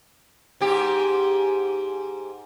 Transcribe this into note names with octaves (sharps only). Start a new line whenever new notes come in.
G#2 G4